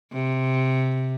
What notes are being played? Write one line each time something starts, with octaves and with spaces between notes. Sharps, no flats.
C3